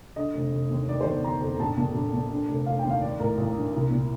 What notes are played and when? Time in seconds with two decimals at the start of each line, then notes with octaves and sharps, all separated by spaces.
0.16 D3 D#5
0.34 F1
0.52 F1
0.70 D#2
0.88 D#3 D5
1.01 C5
1.06 G1
1.12 D5
1.24 G1 A#5
1.42 F2
1.59 A#1 A5
1.77 A#2 A5
1.95 A#1
2.13 A#2
2.31 D3
2.48 F1
2.66 F1 F5
2.79 G5
2.84 D#2
2.90 F5
3.02 D#3 D5
3.20 A1 A#4
3.38 A1
3.56 G2
3.74 C2
3.91 A#2